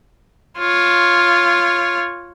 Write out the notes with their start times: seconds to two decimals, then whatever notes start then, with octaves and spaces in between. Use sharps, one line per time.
0.58 F4 C#5